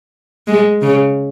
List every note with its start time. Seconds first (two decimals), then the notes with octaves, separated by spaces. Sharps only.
0.47 G#3
0.82 C#3